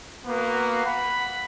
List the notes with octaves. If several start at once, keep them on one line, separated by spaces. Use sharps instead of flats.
A#3 B3 F#4 B4
F#5 B5